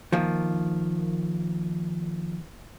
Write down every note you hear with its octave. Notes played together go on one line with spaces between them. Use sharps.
D#3 F3 A#3